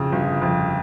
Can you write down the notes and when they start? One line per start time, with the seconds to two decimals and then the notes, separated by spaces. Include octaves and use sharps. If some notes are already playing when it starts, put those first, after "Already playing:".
Already playing: F2 C#3 F3
0.12 G1
0.42 F2